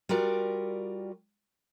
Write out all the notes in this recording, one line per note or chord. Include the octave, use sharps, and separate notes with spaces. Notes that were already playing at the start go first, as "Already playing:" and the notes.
G3 F4 F#4 A#4 D5